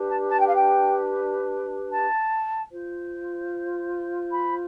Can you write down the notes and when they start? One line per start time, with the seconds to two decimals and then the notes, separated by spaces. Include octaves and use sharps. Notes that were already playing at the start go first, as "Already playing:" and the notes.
Already playing: D4 G4 B4
0.09 A5
0.29 A5
0.38 G5
0.46 F5
0.55 G5
1.89 A5
2.71 F4 C5
4.30 B5